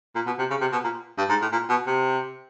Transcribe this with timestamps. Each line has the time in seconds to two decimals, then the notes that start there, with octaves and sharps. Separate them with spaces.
0.15 A#2
0.26 B2
0.39 C3
0.50 C#3
0.61 C3
0.72 B2
0.84 A#2
1.18 G2
1.29 G#2
1.41 A2
1.52 A#2
1.70 B2
1.87 C3